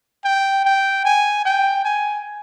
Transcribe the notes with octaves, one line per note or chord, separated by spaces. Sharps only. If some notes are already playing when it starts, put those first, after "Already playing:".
G5
G5
G#5
G5
G#5